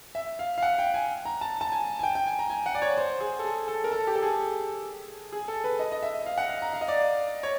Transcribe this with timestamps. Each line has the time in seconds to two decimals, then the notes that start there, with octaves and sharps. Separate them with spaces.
0.15 E5
0.39 F5
0.58 F5
0.63 F#5
0.78 G5
0.94 G#5
1.25 A#5
1.41 A5
1.61 A5
1.72 G#5
1.99 G#5
2.03 G5
2.15 G5
2.27 G#5
2.39 A#5
2.50 G#5
2.66 F#5
2.75 D5
2.82 C#5
2.97 C5
3.20 G#4
3.39 A4
3.44 G#4
3.68 A4
3.84 A#4
3.92 A4
4.07 G4
4.15 A4
4.22 G#4
5.32 G#4
5.48 A4
5.64 B4
5.79 D#5
5.92 D#5
6.03 E5
6.26 F5
6.38 F#5
6.49 F5
6.62 A#5
6.73 F5
6.81 D#5
6.88 D5
7.43 C#5